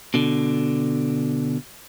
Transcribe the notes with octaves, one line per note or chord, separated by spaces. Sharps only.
B2 D3